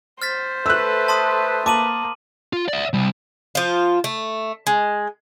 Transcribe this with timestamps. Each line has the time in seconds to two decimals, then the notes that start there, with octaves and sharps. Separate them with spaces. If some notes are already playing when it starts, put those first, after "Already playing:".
0.22 C5 F6 A6 B6
0.66 A3 A4 B4 E6 F#6
1.08 A5 C6 D#6
1.66 A#3 A5 D6 D#7 F#7
2.53 F4
2.68 D5 E5
2.93 C3 G3
3.55 F3 F4
4.04 A3
4.67 G#3